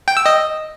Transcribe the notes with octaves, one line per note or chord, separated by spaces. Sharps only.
G5
E6
D#5